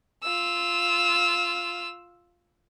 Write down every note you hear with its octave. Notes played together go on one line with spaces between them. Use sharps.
F4 E6